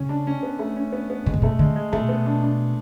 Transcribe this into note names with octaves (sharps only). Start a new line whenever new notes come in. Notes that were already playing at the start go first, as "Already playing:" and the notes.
Already playing: C#3 C#4
D4
C#4
B3
A3
C#4
B3
B3
B2 G#3
C#3
B2 A3
D3 G#3
G#3
B2 A3
B3
D4
D4